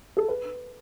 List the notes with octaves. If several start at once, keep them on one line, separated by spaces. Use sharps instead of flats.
A4
B4